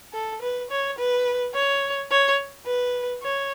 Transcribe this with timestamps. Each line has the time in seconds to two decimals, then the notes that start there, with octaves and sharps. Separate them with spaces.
0.13 A4
0.42 B4
0.71 C#5
0.98 B4
1.54 C#5
2.11 C#5
2.66 B4
3.23 C#5